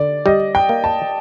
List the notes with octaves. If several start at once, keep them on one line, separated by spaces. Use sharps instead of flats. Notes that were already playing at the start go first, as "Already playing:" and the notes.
Already playing: D3 D5
G3 D#5
G5
A#3
A5